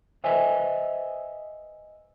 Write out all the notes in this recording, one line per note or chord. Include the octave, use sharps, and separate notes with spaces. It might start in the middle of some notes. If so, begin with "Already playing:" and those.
B4 C5 D#5 E5 G#5